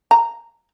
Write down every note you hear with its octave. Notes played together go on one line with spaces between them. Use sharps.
A#5